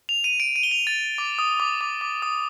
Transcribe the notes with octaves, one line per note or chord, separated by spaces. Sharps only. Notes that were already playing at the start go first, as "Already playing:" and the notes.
F7
D#7
D7
D#7
G7
F7
A6
D6
D#6
D6
D6
D6
D#6